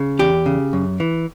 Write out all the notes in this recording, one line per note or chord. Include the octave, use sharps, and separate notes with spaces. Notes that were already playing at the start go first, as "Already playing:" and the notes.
Already playing: C#3
E2 G4
C#3
F#2
E3